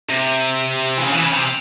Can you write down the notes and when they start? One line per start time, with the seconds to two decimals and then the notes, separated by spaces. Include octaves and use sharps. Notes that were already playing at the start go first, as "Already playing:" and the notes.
0.10 C3
0.98 E3
1.02 C#3
1.13 E3
1.23 C#3
1.33 C3